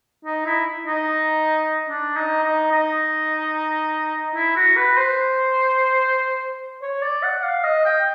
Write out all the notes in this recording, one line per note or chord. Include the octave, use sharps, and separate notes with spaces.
D#4
E4
D#4
D4
D#4
D#4
D#4
E4
F#4
B4
C5
C#5
D5
F#5
F5
D#5
G5